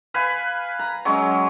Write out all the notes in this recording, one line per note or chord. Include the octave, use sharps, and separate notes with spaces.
B4 F5 G#5 B5
A#5
F#3 G#3 C#4